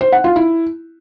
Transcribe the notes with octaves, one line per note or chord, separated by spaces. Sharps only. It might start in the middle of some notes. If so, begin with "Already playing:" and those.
C5
F#5
F4
E4